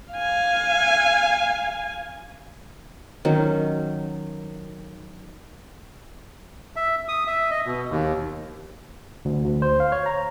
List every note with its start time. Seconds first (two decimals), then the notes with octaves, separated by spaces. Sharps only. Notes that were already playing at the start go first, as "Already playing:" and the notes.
0.13 F5 G#5
3.25 D#3 F#3 C#4
6.76 E5
7.08 D#6
7.27 E5
7.51 D#5
7.66 B2
7.90 D#2
9.25 D2
9.45 D2
9.62 C5
9.80 F5
9.92 C#5
10.06 A#5